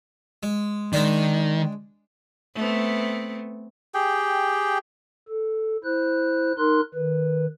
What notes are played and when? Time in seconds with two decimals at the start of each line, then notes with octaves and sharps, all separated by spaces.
0.43 G#3
0.93 D#3 G#3 D4 D5
2.55 A3 B3 C4
3.94 G4 G#4 G5
5.28 A4
5.84 E4 C5 F#6
6.58 D#4 A#4 C6 F#6
6.94 D#3 B4